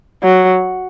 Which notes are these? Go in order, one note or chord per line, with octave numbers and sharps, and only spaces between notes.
F#3